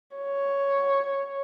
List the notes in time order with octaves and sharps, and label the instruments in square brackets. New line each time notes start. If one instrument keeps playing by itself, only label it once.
[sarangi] C#5